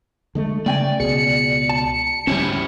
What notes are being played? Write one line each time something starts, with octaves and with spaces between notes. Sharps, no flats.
D3 G#3 A3
C#3 A3 D5 G5 G#5
C#2 B2 G#4 C#7
A5
D2 G3 C#4 E4 C5 C#5